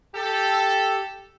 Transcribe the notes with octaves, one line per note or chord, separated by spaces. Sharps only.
G4 A4